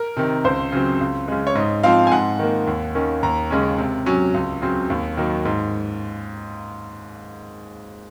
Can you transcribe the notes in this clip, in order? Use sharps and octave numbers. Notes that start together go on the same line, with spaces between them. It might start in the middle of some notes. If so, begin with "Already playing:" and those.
Already playing: A#4
C3 D#3
C#2 C5
C#3 F#3 C4
C#2
C#3 G#3
C#5
G#2 D#5
F3 C4 F5
G#5
G#2 F#5
D#3 A#3
D#2
D#3 A#3 C#4
D#2 A#5
C#3 G#3 C#4
C3
F#3 C#4
C#2
C#3 F#3 C4
D#2
D#3 F#3 A#3
G#2